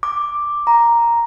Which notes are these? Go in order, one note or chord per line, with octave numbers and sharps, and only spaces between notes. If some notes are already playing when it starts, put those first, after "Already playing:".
D6
A#5